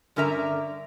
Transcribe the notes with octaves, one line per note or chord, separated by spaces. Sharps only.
G2 D3 C#4 A#4 E5 A#5